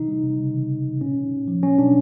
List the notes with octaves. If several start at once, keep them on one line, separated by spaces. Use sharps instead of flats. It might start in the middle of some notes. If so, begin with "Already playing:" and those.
Already playing: C3 E3 D#4
G3
C3
C#3
E3
C#3
C#3
A#2 C#4
A#2
A#2
F3
F#3 C#4
B2 D4